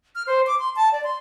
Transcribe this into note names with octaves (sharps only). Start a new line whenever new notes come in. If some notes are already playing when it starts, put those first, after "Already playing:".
F6
C5
D6
C6
A5
D5
C6